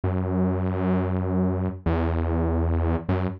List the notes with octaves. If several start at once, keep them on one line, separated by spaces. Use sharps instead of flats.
F#2
E2
F#2